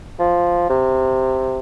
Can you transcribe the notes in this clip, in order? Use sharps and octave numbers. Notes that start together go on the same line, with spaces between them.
F3
C3